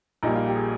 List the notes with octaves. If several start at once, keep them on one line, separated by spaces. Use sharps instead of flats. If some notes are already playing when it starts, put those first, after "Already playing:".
A#1 A#2 G3 A#3 D#4
F4
G4
G#4